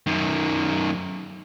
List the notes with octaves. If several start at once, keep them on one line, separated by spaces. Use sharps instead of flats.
F#2 D#3